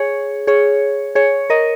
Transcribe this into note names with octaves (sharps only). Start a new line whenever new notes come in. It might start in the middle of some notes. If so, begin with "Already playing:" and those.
Already playing: G#4 C#5
G#4 C#5
G#4 C#5
A#4 D#5